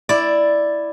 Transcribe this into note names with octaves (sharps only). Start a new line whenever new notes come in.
E4 D5